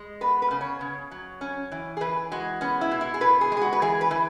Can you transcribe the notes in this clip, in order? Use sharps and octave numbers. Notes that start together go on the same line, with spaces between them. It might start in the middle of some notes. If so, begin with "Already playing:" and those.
Already playing: G#3
B3 B4
B4
C#3
C#5
C#3
F#3
C#4
E3
G#4
E3 B4
G#3 F#4
B3 C#4
E4
B2
E4
G#4
B2 B4
G#4
G#3
G#4
F#4
B4
E3 G#4
B4
E3